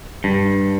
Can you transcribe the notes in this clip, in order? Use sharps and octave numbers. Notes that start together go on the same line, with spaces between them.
G2